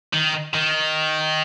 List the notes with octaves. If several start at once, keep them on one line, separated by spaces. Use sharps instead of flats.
D#3
D#3